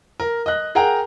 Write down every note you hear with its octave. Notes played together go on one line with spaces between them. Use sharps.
A#4
D#5 F#6
G#4 A#4 F#5 G5 A#5